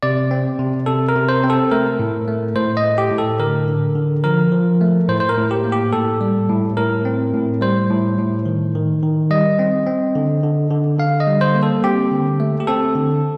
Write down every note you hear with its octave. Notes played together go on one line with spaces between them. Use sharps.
C3 D5
C4
C3
C3 A4
A#4
C3
C5
C4
A4
A3 A#4
A2
A3
A2 C5
D#5
A3
G4
A2
A4
D3 A#4
D3
D3
F3 A#4
F3
A3
A2 C5
C5
A#4
A2
G4
A#3
G4
A2 A4
G3
A2
A2 A#4
C4
A2
G3 C5
A2
A2
D#3
D#3
D#3
G3 D#5
C4
C4
D3
D3
D3
D3 F5
D#5
G3
C5
A#3
A4
C4 G4
D3
A3
G4
C4 A4
D3